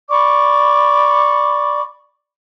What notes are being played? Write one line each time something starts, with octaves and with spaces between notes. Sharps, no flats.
D5 B5 C#6 D6